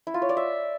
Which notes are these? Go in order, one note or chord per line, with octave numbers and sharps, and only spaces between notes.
E4
F4
C#5
D5
E5